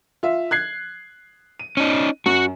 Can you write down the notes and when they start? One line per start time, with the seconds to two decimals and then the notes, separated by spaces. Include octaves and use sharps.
0.23 F4 E5
0.51 F#6 G#6 C7
1.60 D#7
1.77 C#4 D#4
2.26 F#2 F#4